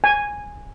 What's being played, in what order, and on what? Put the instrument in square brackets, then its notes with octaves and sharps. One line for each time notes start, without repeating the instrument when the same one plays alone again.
[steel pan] G#5